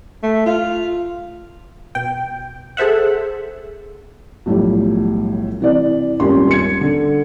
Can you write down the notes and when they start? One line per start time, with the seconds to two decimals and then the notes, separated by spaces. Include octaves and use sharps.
0.23 A3
0.46 F4
1.95 B2 G5
2.77 G#4 A4 C5 E5 F#5
4.46 B1 A2 F3 G3
5.60 C3 E3 D5
6.20 D#1 G#1 D#3 G3 C#4 C6
6.51 G#6 C#7
6.81 D3